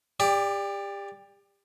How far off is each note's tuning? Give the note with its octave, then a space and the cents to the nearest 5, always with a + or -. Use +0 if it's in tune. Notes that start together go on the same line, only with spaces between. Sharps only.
G4 +30 D5 +0